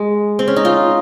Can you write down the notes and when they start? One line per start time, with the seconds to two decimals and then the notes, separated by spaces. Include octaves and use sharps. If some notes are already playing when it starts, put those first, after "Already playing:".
Already playing: G#3
0.39 C4
0.48 C#4
0.56 D#4
0.65 F4